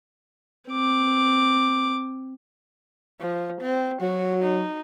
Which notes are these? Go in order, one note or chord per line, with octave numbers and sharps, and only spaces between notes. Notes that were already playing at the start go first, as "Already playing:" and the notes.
C4 D6
F3
C4
F#3 F#4
D#4